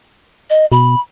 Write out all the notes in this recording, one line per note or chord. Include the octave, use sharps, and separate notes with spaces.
D#5
B2 B5